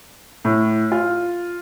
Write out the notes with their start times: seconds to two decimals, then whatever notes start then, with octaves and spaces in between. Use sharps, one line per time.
0.45 A2
0.92 F4